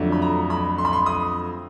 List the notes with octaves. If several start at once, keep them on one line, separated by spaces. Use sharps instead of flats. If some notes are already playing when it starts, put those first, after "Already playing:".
Already playing: F2 D3 F#3 A3 D4
B5
A#5
B5
C6
B5
C6
D#6